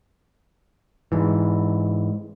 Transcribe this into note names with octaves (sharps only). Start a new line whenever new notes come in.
G#2 E3